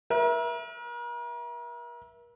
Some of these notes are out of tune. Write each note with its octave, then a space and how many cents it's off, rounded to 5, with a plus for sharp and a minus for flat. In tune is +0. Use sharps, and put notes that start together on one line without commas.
A#4 +40 E5 +0